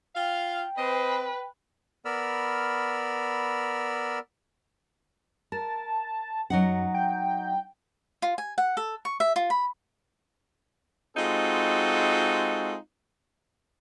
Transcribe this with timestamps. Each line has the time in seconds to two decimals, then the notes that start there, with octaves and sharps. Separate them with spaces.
0.15 F4 F5 G5
0.78 C4 B4 C5 D#5
2.05 B3 A#4 D5 B5 E6 F6
5.52 A#4 A5
6.50 F#2 F#3 D#4 F#5
6.94 G5
8.22 F4
8.38 G#5
8.58 F#5
8.77 A4
9.05 C#6
9.20 E5
9.36 F4
9.50 B5
11.17 G#3 C4 D#4 F4 F#4 A4